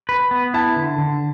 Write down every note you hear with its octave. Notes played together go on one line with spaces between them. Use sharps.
B4
B3
E4 A5
D3
D3